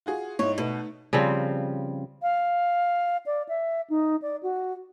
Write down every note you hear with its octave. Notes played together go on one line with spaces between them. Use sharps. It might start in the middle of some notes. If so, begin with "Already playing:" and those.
F4 F#4 G#4
G#2 D#4 E4 C#5
B2 A3 D#4 B4
C#3 F3 G3 C4
F5
D5
E5
D#4
D5
F#4